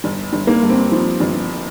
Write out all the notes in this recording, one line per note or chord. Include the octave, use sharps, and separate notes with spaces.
G1
G1
A#3
G2
C4
F3
G1